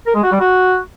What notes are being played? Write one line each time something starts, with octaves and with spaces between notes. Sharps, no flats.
A#4
G#3
F#4
G3
F#4